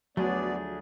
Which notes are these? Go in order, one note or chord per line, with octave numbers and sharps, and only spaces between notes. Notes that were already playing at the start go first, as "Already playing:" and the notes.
D2 F3 F#3 A3 B3 D4 G#4 D5